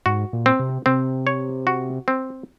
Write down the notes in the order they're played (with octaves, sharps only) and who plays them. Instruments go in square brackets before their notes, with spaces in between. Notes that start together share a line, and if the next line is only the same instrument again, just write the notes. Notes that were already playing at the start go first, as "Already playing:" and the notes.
[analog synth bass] G#2 [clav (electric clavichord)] F#4
[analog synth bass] A#2
[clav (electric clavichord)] C4
[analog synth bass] C3
[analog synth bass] C3 [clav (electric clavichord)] C4
[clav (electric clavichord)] C#5
F#4
C4